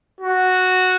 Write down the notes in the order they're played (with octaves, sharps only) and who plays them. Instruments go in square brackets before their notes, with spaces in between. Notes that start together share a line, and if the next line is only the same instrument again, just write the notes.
[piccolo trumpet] F#4